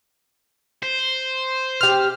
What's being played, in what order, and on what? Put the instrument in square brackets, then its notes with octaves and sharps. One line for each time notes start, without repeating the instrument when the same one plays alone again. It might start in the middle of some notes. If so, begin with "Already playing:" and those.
[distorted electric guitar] C5
[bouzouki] C4 G4 [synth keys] F6